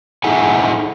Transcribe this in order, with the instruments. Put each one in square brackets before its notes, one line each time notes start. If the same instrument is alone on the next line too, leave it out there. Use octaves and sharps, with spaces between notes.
[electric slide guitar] D#4 E4 G#4 A4 F#5 G#5